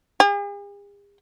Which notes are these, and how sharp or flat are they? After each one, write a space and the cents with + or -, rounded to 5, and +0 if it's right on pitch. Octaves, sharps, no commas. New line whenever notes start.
G#4 -45